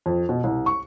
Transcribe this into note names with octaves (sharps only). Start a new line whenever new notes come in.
F2
B2
C2
C#6